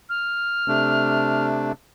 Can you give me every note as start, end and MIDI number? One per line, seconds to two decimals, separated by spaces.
0.09 1.46 89
0.68 1.72 48
0.68 1.72 57
0.68 1.72 62